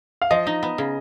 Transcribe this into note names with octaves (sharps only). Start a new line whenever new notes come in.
F5
F3 D#5
D#4
B3
C#3